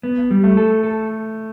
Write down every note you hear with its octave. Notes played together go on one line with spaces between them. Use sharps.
B3
G3
A3
A4
A4